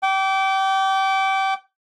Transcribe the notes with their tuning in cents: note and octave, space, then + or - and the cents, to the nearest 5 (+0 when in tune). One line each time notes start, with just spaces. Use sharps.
G5 -25 D6 -25